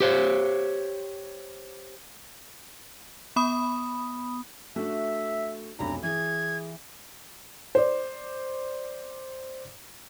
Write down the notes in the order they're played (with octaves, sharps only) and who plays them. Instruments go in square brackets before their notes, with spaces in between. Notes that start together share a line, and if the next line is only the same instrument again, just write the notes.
[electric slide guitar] G4 C5 C#5
[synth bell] B3 B5 D#6
[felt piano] A3 D4 F#4 [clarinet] E5
[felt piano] F1 B1 B5 [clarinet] D4 [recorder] A#5
[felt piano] E3 [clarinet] G#4 [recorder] G#6
[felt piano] C5 D5